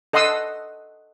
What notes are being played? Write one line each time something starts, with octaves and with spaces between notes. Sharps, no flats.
A4 D#5 F#5 C6 D#6 E6